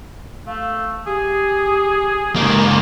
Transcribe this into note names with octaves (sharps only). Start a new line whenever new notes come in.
A3 F5
G4 G#4
C#2 A#3 D#4